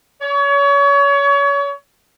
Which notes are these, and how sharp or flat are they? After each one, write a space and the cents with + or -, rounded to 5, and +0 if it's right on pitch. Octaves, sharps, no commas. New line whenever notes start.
C#5 +30